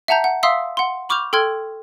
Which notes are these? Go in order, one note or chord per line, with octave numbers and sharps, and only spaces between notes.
E5 F#5 A5 A#5 G6
F#5
E5 F5 C6 D#6 E6 B6
F#5 C6
B5 C#6 D6 F6 G6 F7
A4 G5 C6 F6 G#6